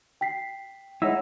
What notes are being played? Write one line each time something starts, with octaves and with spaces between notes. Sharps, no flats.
G5 B6 C7
G#3 D#4 E4 C#5 F#5 E6